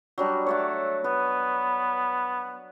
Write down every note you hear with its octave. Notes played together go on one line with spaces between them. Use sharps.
F#3 G3 D4
A3 C#5 D5 F#5
B3 B4